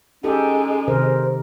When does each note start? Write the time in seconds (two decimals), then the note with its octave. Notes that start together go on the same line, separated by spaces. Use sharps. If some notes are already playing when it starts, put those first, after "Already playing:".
0.24 G#3 C#4 D#4 G4 A4
0.88 C3 D#3 A#4 C5